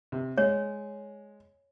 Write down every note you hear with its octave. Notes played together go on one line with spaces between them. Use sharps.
C3
G#3 C#5